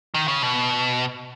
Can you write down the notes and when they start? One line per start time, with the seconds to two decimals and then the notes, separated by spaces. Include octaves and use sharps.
0.14 D#3
0.28 C#3
0.42 B2